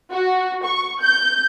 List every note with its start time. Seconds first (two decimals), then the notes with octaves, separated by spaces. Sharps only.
0.12 F#4
0.65 C#6
1.02 G6